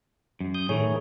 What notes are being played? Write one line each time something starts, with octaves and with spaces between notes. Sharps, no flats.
F#2
D#6 G6
A2 D#3 E3 A3 G#4 C#5